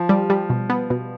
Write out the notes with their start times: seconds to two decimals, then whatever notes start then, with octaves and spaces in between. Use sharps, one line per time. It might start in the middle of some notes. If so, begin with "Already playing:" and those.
Already playing: F3
0.09 G3
0.30 G3
0.50 B2
0.70 B3
0.90 B2